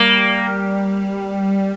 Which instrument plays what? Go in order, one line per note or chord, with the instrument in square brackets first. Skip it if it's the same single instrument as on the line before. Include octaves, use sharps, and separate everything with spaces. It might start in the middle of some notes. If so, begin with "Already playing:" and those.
Already playing: [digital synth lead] G3 [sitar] A#3